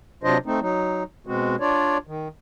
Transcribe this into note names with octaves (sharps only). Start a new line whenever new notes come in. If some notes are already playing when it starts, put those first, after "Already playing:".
C3 F#3 D4 F4 C5 D#5
A3 C4 D#4
F#3 D#4
B2 G#3 C4 F#4
D4 F4 C#5 D5
D#3